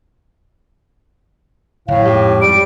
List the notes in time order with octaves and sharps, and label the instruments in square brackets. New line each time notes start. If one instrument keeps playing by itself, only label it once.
[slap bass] F#1 [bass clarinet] A2 [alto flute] F5
[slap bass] F2 G#2 [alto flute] G4
[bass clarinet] G3 [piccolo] D7